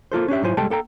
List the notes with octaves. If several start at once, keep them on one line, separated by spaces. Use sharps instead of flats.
A#3 F4 A4 C5
C#4 D4 G4 E5
G#2 F#3 E4 F4 C5 G#5
C2 G3 G#3 A4 G5 A5
A#3 A4 G5 A#5